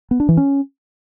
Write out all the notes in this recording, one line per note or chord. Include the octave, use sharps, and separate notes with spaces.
B3
D4
E3
C#4